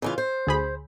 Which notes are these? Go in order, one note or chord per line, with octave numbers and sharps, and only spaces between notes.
C#3 E3 F4
C5
D2 G#4 B5